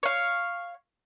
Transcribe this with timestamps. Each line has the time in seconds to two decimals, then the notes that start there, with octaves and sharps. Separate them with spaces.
0.03 C#5 F5